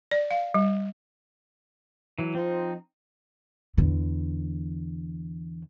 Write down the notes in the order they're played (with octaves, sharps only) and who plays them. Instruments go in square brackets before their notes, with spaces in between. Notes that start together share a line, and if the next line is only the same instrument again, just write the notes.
[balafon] D5
F5
G3
[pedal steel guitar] E3 F#3
[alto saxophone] F3 [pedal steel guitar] C4 D#4
[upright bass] E2 D3